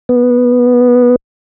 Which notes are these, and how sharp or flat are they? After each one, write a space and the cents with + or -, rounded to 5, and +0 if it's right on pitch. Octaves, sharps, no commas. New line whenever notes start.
B3 -10